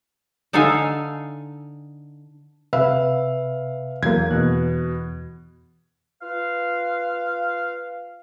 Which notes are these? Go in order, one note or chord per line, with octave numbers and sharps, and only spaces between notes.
D3 D#4 A4 F5 G#5
C3 B4 E5 F5
E2 F#3 A#3 G#6
E2 B2 F#6
F4 B4 F5